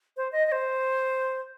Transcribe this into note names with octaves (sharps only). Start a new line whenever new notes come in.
C5
D#5
D#5
C5